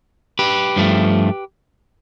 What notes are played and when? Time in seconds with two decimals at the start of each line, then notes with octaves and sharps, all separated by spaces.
0.39 G4 B4
0.76 G2 F3 A3